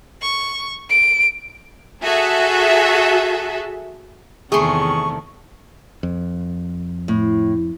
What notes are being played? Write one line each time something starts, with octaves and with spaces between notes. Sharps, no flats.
C#6
D7
F#4 G#4 A4 E5
E2 C3 D#3 A3 G#4 C6 C#6
F2
A2